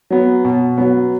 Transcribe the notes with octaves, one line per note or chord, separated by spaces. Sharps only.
F#3 B3
B2
F#3 B3